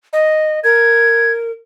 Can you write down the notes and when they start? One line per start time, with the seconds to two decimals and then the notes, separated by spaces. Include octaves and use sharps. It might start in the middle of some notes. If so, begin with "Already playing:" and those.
0.13 D#5
0.64 A#4 G#6